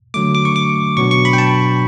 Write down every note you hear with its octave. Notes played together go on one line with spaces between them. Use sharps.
D3 F#3 A3 D6
D6
C#6
D6
B2 F#3 B3 D4 C#6
C#6
B5
G5
A5